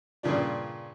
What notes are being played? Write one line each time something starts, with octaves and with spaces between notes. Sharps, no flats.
G2 A#2 C#3 F3 D4